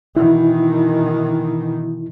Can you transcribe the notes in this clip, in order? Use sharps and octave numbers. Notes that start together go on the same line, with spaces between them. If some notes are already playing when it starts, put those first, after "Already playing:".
B2 D#3 E3 E4